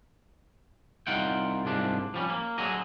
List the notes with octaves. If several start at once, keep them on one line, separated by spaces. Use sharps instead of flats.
C2 D#4 F4 F#5 G5
C2 G#2 D4 F4
F3 G3 C#4
A#3
D3 F#3 G#4 D#5